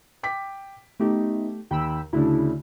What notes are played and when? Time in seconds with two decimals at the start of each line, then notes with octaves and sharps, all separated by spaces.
0.23 G5 D6 B6
0.99 A3 B3 D#4 G4
1.71 D#2 G5 B5 E6
2.13 D2 C#3 D4 E4